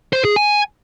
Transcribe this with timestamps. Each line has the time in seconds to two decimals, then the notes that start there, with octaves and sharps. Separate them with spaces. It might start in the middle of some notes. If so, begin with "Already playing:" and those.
0.13 C5
0.25 G#4
0.36 G#5